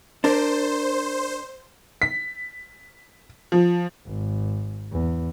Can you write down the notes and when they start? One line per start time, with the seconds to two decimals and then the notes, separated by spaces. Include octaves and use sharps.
0.24 D4 A#4 C5
2.02 B6
3.52 F3
4.06 G#1
4.92 E2